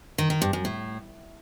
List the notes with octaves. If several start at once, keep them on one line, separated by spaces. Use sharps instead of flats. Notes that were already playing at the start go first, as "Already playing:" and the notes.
D#3
D#3
G2
F#2
A2